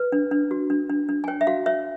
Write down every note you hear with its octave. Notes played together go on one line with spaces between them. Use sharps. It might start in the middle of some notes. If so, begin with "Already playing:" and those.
Already playing: B4
D4
D4
F#4
D4
D4
D4
G#5
C#5 G5
E5
F#4 F5
C#5 E5